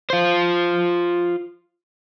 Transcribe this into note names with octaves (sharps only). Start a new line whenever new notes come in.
F4 C5